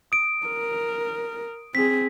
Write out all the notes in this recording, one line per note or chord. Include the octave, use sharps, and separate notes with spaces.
D#6 D7
A#4
C4 G#4 B6